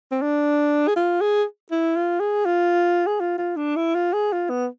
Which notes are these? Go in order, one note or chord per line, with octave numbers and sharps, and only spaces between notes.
C4
D4
G#4
F4
G#4
E4
F4
G#4
F4
G#4
F4
F4
D4
E4
F4
G#4
F4
B3